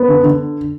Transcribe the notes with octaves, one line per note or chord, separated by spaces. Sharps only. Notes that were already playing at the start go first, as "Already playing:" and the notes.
Already playing: B3
D3
D3